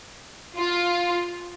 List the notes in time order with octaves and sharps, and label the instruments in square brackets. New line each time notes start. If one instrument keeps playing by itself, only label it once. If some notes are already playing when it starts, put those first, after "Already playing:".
[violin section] F4